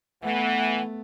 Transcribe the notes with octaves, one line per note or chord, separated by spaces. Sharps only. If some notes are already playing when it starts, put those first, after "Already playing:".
E3 A3 B3 F#5